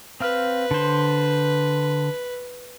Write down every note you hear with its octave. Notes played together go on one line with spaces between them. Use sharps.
C4 B4 F5 F6
D3 C5